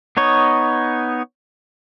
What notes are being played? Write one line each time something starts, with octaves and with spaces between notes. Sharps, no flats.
B3 D#4 C#5